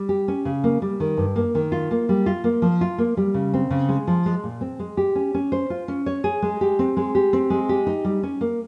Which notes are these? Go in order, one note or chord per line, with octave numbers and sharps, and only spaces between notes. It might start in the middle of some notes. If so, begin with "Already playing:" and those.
Already playing: G3
G4
C#4
C#3
A#3
G3
D#3
G2
A#3
D#3
F4
A#3
G3
F4
A#3
F3
F4
A#3
G3
C#3
C4
C#3
G#3
F3
G#3
A#2
C4
G#3
G4
C#4
C#4
C5
F4
C#4
C#5
G#4
G#3
G4
C4
G#3
G4
C4
G#3
G4
D#4
G3
C#4
A#3